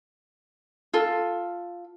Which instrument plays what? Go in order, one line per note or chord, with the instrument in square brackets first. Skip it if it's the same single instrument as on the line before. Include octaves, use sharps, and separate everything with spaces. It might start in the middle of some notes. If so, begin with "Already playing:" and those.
[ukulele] F4 A4